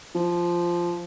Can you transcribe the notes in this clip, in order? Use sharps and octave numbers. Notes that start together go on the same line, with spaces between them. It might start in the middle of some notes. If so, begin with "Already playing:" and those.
F3